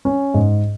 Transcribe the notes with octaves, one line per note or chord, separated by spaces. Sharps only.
C#4
G#2